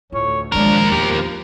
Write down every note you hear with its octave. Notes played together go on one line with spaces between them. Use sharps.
D2 A2 F4 C#5
A#1 D#2 D#3 F3 G#3 D4 A#4
E2 G4